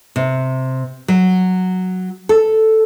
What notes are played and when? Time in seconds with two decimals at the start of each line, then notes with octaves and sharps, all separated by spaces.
0.16 C3
1.08 F#3
2.29 A4